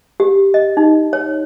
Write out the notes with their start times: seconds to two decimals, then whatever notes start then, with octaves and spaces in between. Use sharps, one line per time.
0.20 G4
0.54 D#5
0.77 D#4
1.13 C#5